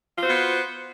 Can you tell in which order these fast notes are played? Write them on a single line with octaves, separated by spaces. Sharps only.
F4 C5 F#4 B3